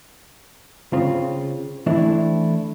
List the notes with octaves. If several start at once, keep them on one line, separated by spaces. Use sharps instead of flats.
C#3 C4 F4
E3 A3 C4 D4 E4